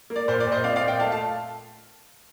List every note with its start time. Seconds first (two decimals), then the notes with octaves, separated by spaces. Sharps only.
0.10 A#3
0.16 D5
0.28 A#2 C5
0.40 D5
0.46 A#2
0.52 C5 D#5
0.64 C4 D5 F5
0.76 D5 F5
0.81 A#2
0.88 D#5 G5
0.99 A3 F5 A5
1.12 F5 A5